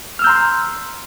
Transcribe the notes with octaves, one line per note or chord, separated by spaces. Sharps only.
A#5 C6 E6 F6 G6